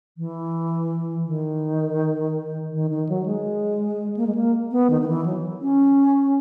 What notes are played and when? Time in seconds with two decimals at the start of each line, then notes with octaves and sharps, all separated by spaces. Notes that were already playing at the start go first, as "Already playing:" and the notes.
0.17 E3
1.26 D#3
2.72 D#3
2.91 D#3
3.09 F#3
3.26 G#3
4.17 A#3
4.27 G#3
4.35 A#3
4.71 B3
4.90 D#3
5.01 D#3
5.08 E3
5.26 F#3
5.62 C#4